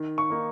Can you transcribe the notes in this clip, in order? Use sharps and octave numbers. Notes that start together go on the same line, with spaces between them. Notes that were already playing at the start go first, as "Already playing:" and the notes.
Already playing: D#3
C#6
A#3 D#4